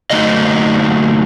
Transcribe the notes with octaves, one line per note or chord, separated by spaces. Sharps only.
D3 F#3 A3 D#4 D#5